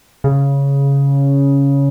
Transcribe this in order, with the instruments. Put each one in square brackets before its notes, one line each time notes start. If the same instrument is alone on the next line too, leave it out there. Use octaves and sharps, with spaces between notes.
[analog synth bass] C#3